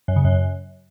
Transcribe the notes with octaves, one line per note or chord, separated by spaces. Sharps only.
F#2
C#3
F#2